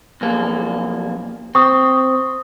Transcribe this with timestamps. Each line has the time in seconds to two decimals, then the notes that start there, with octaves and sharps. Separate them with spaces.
0.21 B1 F2 A#3
1.55 C4 C#6 D#6